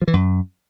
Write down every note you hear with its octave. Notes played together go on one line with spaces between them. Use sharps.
F3
E3
F#2